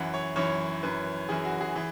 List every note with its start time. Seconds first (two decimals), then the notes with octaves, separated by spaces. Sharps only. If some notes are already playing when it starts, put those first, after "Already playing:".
Already playing: F#2 E3 F#5
0.14 C#5
0.36 F#2 E3 C#5
0.83 F#2 E3 B4
1.29 F#2 E3 G#4
1.45 F#4
1.61 G#4
1.76 E3 G#4